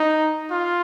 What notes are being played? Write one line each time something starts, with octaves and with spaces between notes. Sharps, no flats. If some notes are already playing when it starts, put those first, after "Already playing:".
Already playing: D#4
F4